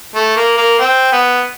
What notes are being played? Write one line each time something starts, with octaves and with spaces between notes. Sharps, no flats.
A3
A#3
A#3
C4
B3